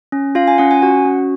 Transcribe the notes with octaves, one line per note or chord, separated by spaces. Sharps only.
C#4
F4 F5
G#5
C#4 F#5
G#5
F#4 F#5
C#4